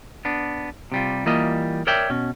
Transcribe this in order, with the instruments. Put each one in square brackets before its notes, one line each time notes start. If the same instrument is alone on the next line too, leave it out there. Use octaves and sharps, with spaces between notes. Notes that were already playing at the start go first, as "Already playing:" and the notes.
[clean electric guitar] B3 D4
C3 G3 F4
E3 G3 A#3 F4 D#5
A#4 C#5 D5 E5 G5
B2 C#4